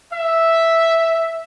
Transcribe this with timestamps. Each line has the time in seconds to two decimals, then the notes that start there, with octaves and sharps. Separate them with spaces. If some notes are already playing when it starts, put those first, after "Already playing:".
0.12 E5